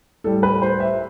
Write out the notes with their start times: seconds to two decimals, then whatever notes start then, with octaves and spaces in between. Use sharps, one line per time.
0.24 A2 G3 A4
0.43 B4
0.62 C5
0.80 E5